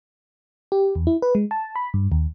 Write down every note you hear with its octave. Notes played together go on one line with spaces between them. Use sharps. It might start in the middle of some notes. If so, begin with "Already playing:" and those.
G4
E2
E4
B4
G#3
A5
B5
G2
D#2